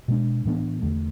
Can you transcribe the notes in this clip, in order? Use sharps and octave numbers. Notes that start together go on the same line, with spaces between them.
B2 G#3 D4
A2 E3 B3 D4
E2 D3 A3